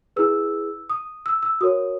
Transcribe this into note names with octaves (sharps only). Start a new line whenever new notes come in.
E4 G#4 B4 E6
D#6
E6
E6
F#4 A#4 C#5 D#6